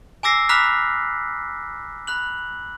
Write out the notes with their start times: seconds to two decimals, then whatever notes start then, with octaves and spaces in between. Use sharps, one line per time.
0.23 G#5 A#5 D6 E6 A#6 C7
0.49 A#5 B5 D6 F6 F#6 B6
2.07 B5 F#6 F#7